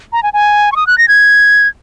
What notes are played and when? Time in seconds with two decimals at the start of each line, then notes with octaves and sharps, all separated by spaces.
0.13 A#5
0.23 G#5
0.33 G#5
0.72 C#6
0.76 D#6
0.87 F#6
0.98 A#6
1.08 G#6